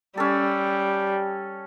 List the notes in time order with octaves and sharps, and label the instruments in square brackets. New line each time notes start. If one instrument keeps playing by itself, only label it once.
[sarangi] G3 [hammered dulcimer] C#4 A4